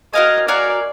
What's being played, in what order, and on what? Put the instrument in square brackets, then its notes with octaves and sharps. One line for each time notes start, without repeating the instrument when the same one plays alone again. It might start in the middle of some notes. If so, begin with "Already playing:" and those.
[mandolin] F#4 A#4 F5 G#5 [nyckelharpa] D#5
[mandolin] F#4 A#4 F5 G#5 [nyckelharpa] D5